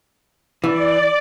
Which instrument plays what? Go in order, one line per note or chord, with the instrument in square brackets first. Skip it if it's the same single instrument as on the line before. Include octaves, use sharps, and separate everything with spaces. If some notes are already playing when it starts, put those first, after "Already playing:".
[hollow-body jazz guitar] E3 [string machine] D5